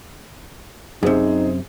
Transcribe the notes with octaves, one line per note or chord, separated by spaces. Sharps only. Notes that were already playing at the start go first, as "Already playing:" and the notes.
F#2 C3 D#4 G#4 C5